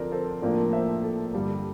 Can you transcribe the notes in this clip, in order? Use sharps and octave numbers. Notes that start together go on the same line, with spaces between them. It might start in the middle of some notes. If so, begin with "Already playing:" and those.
Already playing: D3 F3 C4 A#4 D5
A4 C5
A2 F3 A#3 D4 A#4 D5
C5 E5
A4
G2 D3 G3